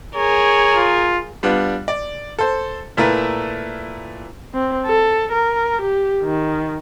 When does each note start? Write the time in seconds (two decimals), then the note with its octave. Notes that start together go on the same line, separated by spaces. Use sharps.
0.15 G#4 A#4 C#5
0.76 F4
1.43 G3 B3 D4 F4
1.88 D5
2.39 A4 C5
2.97 A#2 A3 E4 A#4 B4
4.54 C4
4.86 A4
5.32 A#4
5.81 G4
6.22 D#3